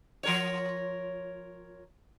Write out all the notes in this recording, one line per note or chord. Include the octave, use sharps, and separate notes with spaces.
F3 A#4 C#5